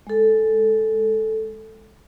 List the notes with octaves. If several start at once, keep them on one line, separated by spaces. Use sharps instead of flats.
G#3 A4